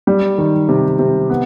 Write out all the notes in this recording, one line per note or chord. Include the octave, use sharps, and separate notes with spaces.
G3
D#3
C3
C3
B3